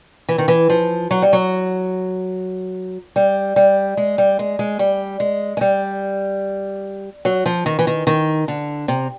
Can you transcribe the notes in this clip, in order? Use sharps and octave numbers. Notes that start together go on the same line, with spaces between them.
E3
D#3
E3
F3
F#3
G3
F#3
G3
G3
G#3
G3
G#3
G#3
G3
G#3
G#3
G3
F#3
F3
D#3
E3
D#3
D#3
D3
C3